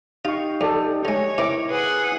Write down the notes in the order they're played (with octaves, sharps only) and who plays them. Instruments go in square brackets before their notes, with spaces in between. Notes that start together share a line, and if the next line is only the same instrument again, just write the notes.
[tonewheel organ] D#4 G4 [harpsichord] F4 [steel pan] F5 C#6
[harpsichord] F2 [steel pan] A4 D5
[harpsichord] D3 G#3 [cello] C#5
[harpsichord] C3 D#3 [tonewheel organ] E4 [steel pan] D6
[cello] G#4 F#5 [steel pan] B4